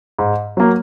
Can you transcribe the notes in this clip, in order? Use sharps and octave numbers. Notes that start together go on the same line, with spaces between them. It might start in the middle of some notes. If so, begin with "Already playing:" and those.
G#2
F#3 A#3